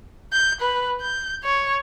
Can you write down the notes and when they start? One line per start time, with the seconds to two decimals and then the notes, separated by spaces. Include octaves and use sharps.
0.33 G6
0.61 B4
1.01 G6
1.44 C#5